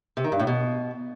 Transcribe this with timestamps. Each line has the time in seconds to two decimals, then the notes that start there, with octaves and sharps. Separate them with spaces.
0.17 C3
0.24 D#3
0.32 G2
0.39 A2
0.47 B2